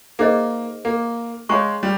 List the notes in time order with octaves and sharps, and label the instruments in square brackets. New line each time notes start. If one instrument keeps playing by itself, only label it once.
[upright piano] A#3 [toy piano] D#4 G#4 C5 D#5
[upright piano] A#3
[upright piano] G#3 [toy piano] G#4 C#5 F5 A#5 C#6
[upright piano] G3